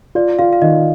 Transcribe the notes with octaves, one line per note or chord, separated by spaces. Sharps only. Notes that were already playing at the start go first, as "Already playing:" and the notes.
F4 D5
F4 F5
F5
D#3 D#5